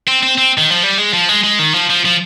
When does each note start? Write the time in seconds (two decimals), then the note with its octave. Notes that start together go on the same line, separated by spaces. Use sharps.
0.07 C4
0.23 C4
0.38 C4
0.58 D#3
0.71 F3
0.83 G3
0.98 G#3
1.13 F3
1.29 G#3
1.44 G#3
1.59 D#3
1.74 F3
1.89 F3
2.05 F3